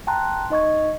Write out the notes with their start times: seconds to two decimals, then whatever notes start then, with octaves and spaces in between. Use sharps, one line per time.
0.07 G5 A5 A#5 C6 F#6
0.50 D#4 D#5 C#6 G#6